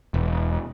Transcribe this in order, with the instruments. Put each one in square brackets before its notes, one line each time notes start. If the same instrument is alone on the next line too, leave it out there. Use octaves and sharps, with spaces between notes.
[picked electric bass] E1